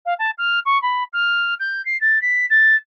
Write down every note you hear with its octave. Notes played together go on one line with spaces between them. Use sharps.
F5
A5
F6
C#6
B5
F6
G6
C7
A6
B6
A6